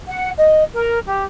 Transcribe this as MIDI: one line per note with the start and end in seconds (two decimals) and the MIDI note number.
0.07 0.30 78
0.37 0.63 75
0.73 0.98 70
1.04 1.24 67